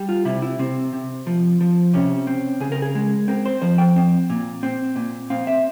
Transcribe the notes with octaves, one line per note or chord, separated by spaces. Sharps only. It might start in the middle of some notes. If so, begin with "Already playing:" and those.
Already playing: G3
F4
C3 E4
E4
C3 C4
C3
F3
F3
C3 C#4
C4
C#3 G#4
A#4
G#4
G#3
C4 A#4
C5
F3 C5
G5
C4
A#2
C4
A#2
C4 F5
E5